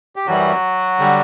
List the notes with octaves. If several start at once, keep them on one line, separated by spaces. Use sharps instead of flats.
G4
F#2 E3 F#3 G3 F#4
D3 G3